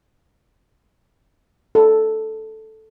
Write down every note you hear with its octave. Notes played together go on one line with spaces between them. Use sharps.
A4